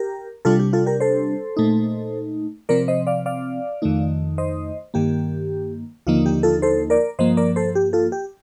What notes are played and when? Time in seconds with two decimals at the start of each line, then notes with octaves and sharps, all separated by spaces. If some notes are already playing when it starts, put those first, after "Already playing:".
Already playing: G4 A#4
0.45 C3 G3 D4 F4 A4
0.59 G4
0.73 F4 A4
0.86 G4 A#4
1.00 A4 C5
1.57 A#2 A3 D#4
2.69 C3 F3 C4 A#4 D5
2.88 C5 D#5
3.07 D5 F5
3.26 D5 F5
3.82 F2 D#3 A3 D#4
4.38 C5 D#5
4.94 G2 D#3 A#3 G4
6.07 D#2 D3 F3 A#3 D#4 F4
6.26 G4
6.43 F4 A4
6.62 A4 C5
6.90 A#4 D5
7.19 G2 F3 A#3 C5 D#5
7.37 A#4 D5
7.56 A4 C5
7.75 G4
7.93 F4 A4
8.12 G4